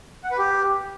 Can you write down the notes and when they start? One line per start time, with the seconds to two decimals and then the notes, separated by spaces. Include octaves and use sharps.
0.24 F#5
0.31 B4
0.38 G4